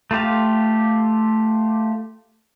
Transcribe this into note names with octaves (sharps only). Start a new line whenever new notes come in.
A3 F4 G4 F5